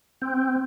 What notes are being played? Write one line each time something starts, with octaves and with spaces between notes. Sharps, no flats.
C4